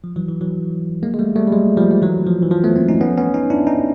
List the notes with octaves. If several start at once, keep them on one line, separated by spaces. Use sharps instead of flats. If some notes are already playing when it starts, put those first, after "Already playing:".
F3
E3 F#3
E3
E3 F#3
G#3 A#3
G#3
G3 A3
G3 A3
G3
F#3 G#3
F3 G3
G3
E3 F#3
F3
E3
F3
A3 B3
A#3 C4
C#4 D#4
B3 C#4
B3 C#4
C#4 D#4
D4 E4
C#4 D#4